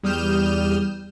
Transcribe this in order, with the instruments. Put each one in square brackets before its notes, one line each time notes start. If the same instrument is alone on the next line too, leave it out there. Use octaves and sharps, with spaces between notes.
[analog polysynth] E2 G3 D#6 F6 G6 E7